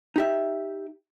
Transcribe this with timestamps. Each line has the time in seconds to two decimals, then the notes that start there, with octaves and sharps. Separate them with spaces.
0.16 D#4 G4 E5